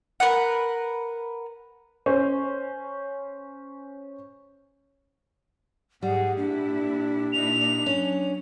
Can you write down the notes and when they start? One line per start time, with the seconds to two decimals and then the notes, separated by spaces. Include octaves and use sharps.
0.20 A#4 B4 F#5
2.06 C#4 C5
6.03 G#2 G3 G#4 F#5
6.37 A#2 D4 E4
7.33 A#2 D#4 E4 F7
7.86 F#3 C#4